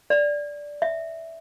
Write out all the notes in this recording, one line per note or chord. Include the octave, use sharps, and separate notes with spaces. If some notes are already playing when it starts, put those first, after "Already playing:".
D5
E5